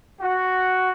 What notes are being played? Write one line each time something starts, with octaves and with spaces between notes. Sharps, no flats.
F#4